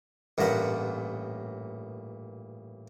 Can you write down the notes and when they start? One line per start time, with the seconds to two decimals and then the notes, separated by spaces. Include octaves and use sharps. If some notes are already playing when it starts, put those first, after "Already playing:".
0.38 A1 G2 A#2 F#5